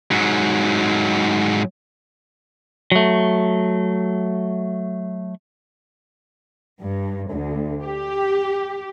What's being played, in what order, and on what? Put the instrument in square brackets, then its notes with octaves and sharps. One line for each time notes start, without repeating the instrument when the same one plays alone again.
[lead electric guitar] G#2 F#3
[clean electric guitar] F#3 A3
[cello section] G2
D2
G4